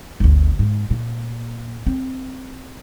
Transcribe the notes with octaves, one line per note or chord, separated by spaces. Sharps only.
G1 D2
G#2
A#2
C4